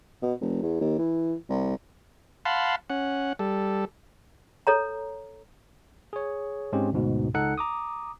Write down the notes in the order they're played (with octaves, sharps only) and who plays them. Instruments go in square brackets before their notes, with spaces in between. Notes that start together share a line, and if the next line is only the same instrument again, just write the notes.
[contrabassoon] B2
F1
E2
D#2
E3
C2
[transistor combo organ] F5 F#5 A5 B5 C6
C#4 F#5
G3 A4
[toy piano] A4 C#5 A#5
[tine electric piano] G#4 C#5
G#2 G#3 C4 C#4 G4
D2 G#2 B2
C#2 D#4 A4 F#5 F#6 C#7
A#5 D6 D#6